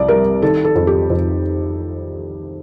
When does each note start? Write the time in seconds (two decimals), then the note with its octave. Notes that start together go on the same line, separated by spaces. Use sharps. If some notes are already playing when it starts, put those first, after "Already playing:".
Already playing: C2 C3 D5
0.08 G3 A#4
0.42 D#3 A4
0.65 A4
0.76 F2
0.87 G4
1.10 F2